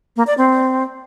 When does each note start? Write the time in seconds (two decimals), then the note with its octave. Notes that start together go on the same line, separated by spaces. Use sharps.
0.16 A#3
0.27 D5
0.37 C4